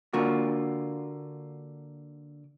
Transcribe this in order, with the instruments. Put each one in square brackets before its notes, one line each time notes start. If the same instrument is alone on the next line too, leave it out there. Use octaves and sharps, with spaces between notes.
[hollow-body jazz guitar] D3 A#3 F4 F#4